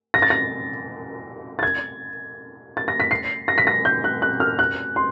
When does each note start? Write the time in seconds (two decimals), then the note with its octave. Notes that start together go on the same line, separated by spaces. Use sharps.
0.14 A#6
0.22 A6
0.30 A#6
1.59 A6
1.63 G#6
2.77 A6
2.88 A#6
3.00 B6
3.11 C7
3.48 A#6
3.58 B6
3.67 A#6
3.85 G6
4.04 F#6
4.22 F#6
4.40 F6
4.59 F#6
4.96 C6